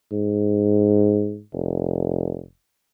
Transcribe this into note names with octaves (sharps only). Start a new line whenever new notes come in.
G#2
F1